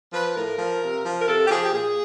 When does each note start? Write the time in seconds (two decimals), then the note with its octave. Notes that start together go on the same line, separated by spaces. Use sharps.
0.13 F3 B4
0.35 A2 A#4
0.58 F3
0.81 C3
1.04 F3
1.19 A#4
1.27 C3 A4
1.46 G4
1.50 F3 G#4
1.65 G4
1.72 A#2 G#4